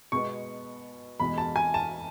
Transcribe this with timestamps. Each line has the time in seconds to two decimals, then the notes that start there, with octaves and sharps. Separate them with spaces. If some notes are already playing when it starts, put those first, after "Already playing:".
0.12 B2 G#3 B3 C#6
1.20 E2 B2 G#3 B5
1.38 A5
1.56 G#5
1.74 A5